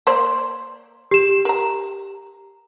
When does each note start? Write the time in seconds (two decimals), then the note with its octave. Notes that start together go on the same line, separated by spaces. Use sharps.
0.07 A#3 C5 D5
1.11 G4 E7
1.45 A#4 A#5